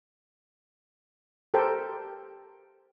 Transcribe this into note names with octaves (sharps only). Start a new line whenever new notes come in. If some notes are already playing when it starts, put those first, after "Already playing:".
G4 A4 A#4 C5 G5